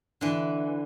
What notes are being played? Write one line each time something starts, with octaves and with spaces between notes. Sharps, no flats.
D3 E3